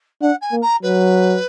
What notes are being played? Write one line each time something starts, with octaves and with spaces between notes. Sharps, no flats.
D4 F#5
G#5
A#3
A#5
F#3 B4